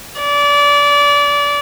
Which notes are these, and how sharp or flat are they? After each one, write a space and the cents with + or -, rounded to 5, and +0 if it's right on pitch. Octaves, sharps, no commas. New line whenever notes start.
D5 -25